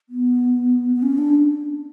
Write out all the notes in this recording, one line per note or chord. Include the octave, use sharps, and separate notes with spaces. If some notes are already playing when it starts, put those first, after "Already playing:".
B3
B3
C#4
D4